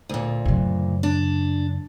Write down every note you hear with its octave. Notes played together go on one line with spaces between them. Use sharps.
D2 A#2
F#2 C#3
D4